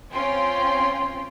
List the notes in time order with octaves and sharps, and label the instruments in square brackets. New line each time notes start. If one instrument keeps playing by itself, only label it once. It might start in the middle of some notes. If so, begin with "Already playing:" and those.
[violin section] C4 C#4 F4 G5 C6